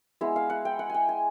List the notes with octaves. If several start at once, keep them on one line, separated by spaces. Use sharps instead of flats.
G#3 B3 E4
F5
F#5
G5
F#5
G5 G#5
G#5